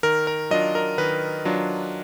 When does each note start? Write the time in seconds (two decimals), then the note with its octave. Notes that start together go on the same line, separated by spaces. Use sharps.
0.03 D#3 A#4
0.27 A#4
0.51 F#3 D4 F4 D#5
0.75 A#4
0.98 D#3 B4
1.45 F#3 D4 F4